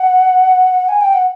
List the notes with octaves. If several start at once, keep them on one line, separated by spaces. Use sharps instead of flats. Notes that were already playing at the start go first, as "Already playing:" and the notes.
Already playing: F#5
G#5
G5
F#5